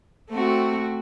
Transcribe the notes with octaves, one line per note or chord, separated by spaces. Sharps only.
A3 C4 F#4